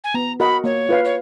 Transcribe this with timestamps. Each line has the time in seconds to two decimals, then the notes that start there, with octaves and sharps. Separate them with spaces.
0.03 G#5
0.14 B3 A#5
0.39 F#4 A#4 D#5 F#5 B5
0.64 A#3 C#5
0.89 F4 B4 F5
1.04 C#5